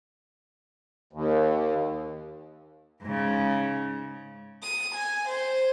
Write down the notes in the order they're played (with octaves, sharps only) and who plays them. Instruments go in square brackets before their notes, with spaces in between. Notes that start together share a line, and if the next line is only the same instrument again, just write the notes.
[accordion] D#2
[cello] G#2 C#3
[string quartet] D#6
G#5
C5